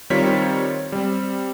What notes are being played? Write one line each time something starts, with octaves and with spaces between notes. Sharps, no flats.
D#3 G3 C4 F4 C#5 B6
G3 C4